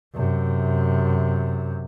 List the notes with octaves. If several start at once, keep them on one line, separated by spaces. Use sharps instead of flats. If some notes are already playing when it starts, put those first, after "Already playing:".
F#2 C3